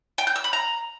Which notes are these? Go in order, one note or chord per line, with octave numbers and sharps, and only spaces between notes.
G5
G6
E6
B5
A#5